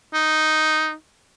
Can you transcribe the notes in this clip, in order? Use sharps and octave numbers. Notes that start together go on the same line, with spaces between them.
D#4